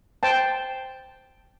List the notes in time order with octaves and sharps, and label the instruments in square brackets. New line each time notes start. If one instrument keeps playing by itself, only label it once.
[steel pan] C5 G5 A5